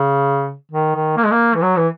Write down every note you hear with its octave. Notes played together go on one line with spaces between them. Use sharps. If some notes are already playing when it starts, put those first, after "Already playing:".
Already playing: C#3
D#3
D#3
A#3
G#3
A#3
E3
F#3
E3